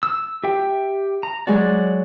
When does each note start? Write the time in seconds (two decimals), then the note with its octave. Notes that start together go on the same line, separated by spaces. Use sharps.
0.03 E6
0.44 G4 E5 G5
1.23 A#5
1.47 F#3 G#3 F#4 D5